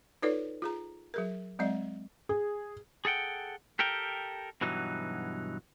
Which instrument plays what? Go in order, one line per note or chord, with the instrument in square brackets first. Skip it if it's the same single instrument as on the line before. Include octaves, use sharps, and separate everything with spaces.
[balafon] D#4 F4 A4 B4 C#5 D5
F4 G#4 A#5
F#3 G#4 A#4
F#3 G#3 C4 D5 D#5
[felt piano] G#4
[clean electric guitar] G#4 A4 F#5 G5
G4 A4 A#4 G5
G2 B2 E3 F#3 D#4